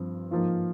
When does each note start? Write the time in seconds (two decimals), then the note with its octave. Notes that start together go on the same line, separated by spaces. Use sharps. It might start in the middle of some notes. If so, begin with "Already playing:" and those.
Already playing: G2 F3 C4
0.31 G#2 F3 A#3 F4